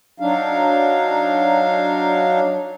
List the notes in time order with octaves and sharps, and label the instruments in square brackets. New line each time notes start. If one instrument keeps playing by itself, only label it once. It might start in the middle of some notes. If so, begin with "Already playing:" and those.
[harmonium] F#3 D4 D#4 F5